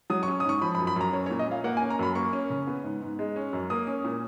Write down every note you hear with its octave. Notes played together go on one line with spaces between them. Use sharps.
F#3 D#6
C#6
C#4
D#6
G#2 C#6
F3 B5
B5
F#2
B5
F#2 A#5
C#4 C#5
C#5
A#2
D#5
A#2 F5
A#3 F#5
G#5
C#4
A#5
F#2 B5
A#3 C#6
C#4
C#3
B3
G#2
G#2
G#3
C#4
F#2
A#3 D#6
C#4
A#2